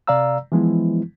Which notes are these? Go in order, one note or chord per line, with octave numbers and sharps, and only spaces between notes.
C3 D5 F5 A#5 E6
E3 F3 G#3 B3 E4